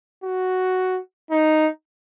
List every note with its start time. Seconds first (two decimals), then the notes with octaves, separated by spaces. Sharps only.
0.24 F#4
1.31 D#4